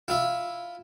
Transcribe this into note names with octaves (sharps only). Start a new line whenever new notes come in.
E4 F4 E5